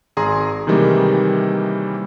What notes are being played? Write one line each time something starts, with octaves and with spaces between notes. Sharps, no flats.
G#1 G#4 A#5 C6
C3 D#3 E3 G3 G#3 A#3